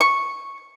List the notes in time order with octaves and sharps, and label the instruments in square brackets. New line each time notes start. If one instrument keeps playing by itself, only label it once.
[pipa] C#6